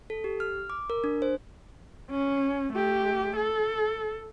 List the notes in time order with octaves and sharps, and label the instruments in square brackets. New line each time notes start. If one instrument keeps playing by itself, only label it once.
[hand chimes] A4
G4
F6
D6
A#4
D4
C5
[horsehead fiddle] C#4
A3 G4
A4